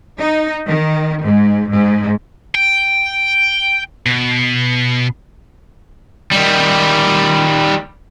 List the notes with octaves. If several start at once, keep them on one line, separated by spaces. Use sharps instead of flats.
D#4
D#3
G#2
G#2
G5
B2
D#3 G3